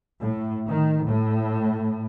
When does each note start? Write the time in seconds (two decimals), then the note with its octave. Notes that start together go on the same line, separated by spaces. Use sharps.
0.21 A2
0.66 D#3
1.04 A2